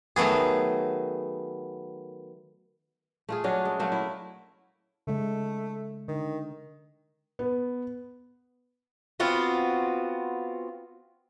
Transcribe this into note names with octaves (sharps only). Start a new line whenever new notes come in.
D#3 F#3 A3 B3 G#4
A3 F4 G#4
F#3 C#4 D4
G#3
F#3 A3 A#3
E4
C#3 G#3 A3
D3 D#3
B3
B3 C4 F4 F#4